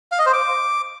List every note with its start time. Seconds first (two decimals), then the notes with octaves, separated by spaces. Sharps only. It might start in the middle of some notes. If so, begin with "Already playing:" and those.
0.12 F5
0.19 D#5
0.26 C5
0.33 D6